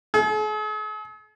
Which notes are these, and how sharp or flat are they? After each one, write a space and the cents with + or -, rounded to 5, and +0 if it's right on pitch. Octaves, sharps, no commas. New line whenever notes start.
G#4 +45